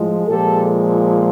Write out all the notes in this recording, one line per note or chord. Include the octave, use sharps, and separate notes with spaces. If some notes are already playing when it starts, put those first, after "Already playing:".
Already playing: A2 F3 G#3
A#2 F3 G#3 G4 A4